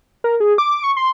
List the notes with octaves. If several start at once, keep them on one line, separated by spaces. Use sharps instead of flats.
A#4
G#4
D6
C#6
C6